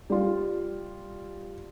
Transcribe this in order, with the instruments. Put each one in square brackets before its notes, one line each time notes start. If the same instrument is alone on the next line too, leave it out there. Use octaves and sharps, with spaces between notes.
[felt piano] G3 F4